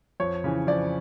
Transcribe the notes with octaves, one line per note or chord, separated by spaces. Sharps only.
F2 C#5
C#3 E3
F2 D5